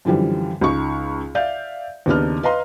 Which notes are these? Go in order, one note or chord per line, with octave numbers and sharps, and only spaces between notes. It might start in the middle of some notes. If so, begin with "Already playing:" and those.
F#2 D3 E3 F3 G3
C#2 D#4 C#6
D5 E5 F5 G6
D#2 C#3 B3 D4 D#4 F6
B4 D#5 F5 A#5 C6